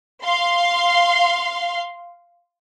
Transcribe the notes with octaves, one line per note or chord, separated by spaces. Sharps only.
F5 C6